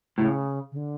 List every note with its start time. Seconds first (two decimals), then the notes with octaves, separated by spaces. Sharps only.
0.18 A2 C#3
0.72 C#3
0.76 D3